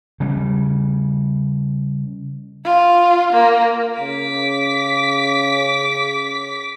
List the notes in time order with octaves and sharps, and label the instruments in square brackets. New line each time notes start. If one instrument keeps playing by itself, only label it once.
[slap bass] C#3 G3
[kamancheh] F4
A#3
[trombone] C#3 [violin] D6 B6